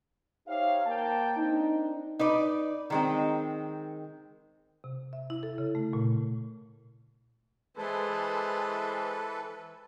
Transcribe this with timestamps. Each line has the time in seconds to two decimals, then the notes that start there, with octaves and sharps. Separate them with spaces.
0.47 D#4 G4 C5 C#5 E5 F5
0.84 A#3 G5 A5
1.37 C4 D4 D#4
2.19 D#4 B4 D5
2.90 D#3 G#3 C4
4.84 C3
5.13 E5
5.30 E4
5.43 A4
5.58 C#3
5.75 A3
5.93 A#2
7.77 E3 G#3 A4 B4 C5